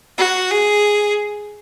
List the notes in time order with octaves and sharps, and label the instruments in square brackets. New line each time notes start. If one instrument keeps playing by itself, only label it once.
[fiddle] F#4
G#4